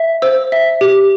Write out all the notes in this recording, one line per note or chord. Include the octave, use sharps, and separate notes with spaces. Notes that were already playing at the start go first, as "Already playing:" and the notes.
Already playing: E5
C5 E6
E5
G4